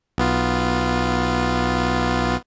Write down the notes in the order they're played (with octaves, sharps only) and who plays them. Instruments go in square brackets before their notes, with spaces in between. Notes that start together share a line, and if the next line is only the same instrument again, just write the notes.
[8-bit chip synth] B1 B3 F4